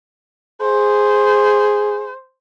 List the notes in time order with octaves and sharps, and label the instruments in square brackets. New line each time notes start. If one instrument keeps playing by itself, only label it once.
[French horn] G#4 [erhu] C5